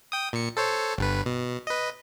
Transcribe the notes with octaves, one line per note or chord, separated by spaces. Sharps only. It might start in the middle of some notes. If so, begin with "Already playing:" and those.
G5 D#6
A#2 C#7
A4 C5 C#5
G1 G2 B4
B2
B4 D#5